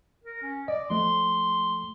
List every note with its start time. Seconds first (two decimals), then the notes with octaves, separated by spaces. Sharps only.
0.24 A#4
0.42 C#4
0.68 D5 D#5
0.90 F3 A3 C6